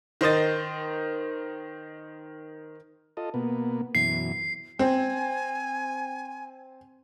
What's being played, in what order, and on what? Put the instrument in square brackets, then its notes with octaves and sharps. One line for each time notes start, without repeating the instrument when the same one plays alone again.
[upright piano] D#3 C5 D#5 A6
[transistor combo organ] F4 A4 D#5
B2 A#3 B3
[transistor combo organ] F#2 B2 E3 [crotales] C7
[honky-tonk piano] C4 [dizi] G#5